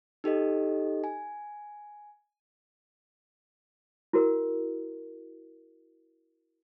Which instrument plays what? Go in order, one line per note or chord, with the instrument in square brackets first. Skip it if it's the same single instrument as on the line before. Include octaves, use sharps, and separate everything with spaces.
[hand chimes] D#4 G4 A4 D#5
G#5
[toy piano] E4 F#4 A#4